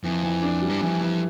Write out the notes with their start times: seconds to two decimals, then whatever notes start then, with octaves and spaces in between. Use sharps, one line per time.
0.04 F2 E3
0.23 E3
0.42 D4
0.62 G3
0.69 G2
0.81 F2 E3
1.01 E3